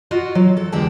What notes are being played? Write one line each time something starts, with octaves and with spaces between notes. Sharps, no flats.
F4 F#4 D#5
F#3
A4
E2 D3 G#3 G4 G5 A5